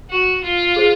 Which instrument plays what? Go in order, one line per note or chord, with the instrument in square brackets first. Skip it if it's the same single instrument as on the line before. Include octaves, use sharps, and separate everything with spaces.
[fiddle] F#4
F4
[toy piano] G#4 C5